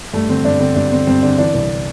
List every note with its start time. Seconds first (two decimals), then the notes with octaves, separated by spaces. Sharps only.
0.13 G2 A3
0.29 D3 C4
0.45 G2 D4
0.60 D3 C4
0.75 G2 D4
0.92 D3 C4
1.07 G2 C4
1.23 D3 D4
1.38 E3 D4
1.54 C2